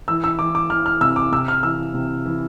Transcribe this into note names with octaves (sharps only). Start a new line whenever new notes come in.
E3 E6
E6
E3 D6
D6
E3 F6
F6
C3 E6
D6
C3 E6
F6
E3 E6
C3
E3